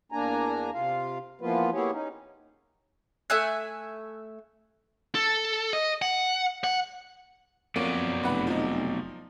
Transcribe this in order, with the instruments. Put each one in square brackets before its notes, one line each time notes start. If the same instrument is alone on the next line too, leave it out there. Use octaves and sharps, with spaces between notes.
[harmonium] E2 A#3 D4 G#5 A#5
C3 F4 F5
E3 F3 A#3 B3 F4 B4
A#3 B3 E4 G4 G#4 C#5
C#4 D#4
[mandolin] A3 E5 G#5 F#6
[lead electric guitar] A4
D#5
F#5
F#5
[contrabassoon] F2 [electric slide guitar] F#3 B3 D5 [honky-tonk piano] A#3 C#5 D#7
[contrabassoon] F1 [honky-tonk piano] B4 F#5 B5
[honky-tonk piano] F3 D#4